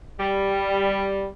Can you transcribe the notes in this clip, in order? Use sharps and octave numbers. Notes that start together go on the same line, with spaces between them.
G3